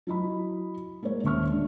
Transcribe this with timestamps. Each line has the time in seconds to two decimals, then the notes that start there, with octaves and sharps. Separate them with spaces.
0.07 F#3 E4 D#5 B5
1.03 G#3 A#3 A#4 C#5
1.23 D#1 C#4 E5 C#6 F6
1.50 G#3 D4